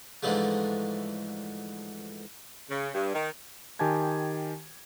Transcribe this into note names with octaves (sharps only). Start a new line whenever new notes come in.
G#2 D3 E3 F3 G#3 A3
C#3
G2
D#3
D#3 G4 G#5 A5 G#6